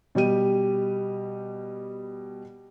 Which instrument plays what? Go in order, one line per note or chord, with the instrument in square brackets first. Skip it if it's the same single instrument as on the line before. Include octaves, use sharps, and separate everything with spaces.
[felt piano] B2 G3 G4 D#7